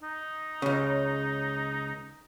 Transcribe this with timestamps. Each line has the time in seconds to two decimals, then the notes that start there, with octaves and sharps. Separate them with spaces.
0.03 D#4
0.62 C#2 C#3